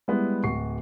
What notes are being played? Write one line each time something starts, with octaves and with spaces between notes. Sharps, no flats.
G3 G#3 B3 E4
D1 F#4 C#6 C7